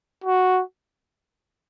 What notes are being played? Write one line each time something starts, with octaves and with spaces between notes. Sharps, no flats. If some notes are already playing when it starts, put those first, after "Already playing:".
F#4